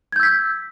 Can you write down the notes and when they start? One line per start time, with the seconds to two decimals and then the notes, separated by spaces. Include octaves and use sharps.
0.12 G#6
0.16 G6
0.20 E6
0.23 B6